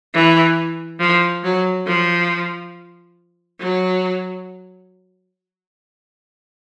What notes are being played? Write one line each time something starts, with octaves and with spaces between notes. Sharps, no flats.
E3
F3
F#3
F3
F#3